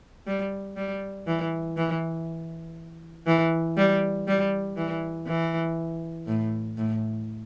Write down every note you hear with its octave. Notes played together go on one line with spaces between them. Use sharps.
G3
G3
E3
E3
E3
G3
G3
E3
E3
A2
A2